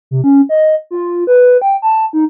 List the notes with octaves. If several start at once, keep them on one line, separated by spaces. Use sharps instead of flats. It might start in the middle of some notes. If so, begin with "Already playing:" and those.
C3
C#4
D#5
F4
B4
G5
A5
D#4